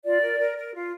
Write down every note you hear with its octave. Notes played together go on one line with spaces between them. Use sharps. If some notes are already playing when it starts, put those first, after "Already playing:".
F4 D5
A#4
A#4
A#4
F4